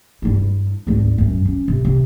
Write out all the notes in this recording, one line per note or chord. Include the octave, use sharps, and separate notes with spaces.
G2 E4
G#1 D2
E1 F#2
C#4
C3
C3